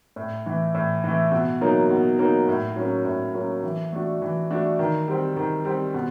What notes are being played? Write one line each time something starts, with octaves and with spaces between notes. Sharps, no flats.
A2
E3 A3
A2
E3 A3
B2
F#3 A#3 D#4
B2
F#3 A#3 D#4
A2
F#3 A#3 C#4
A2
F#3 A#3 C#4
E3
A3 D4 F#4
E3
A3 D4 F#4
D#3
G3 C4
D#3
G3 C4
B2